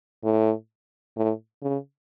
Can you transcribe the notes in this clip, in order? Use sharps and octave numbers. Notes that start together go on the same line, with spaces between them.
A2
A2
C#3